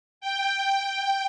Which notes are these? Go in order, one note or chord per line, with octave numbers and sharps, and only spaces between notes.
G5
G5